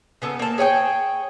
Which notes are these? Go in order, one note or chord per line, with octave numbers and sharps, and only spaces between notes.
C#3 B3 A4
A#3 A5
G#4 C#5 F#5 G5